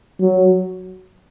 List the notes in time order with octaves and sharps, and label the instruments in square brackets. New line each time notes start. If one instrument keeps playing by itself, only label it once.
[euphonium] F#3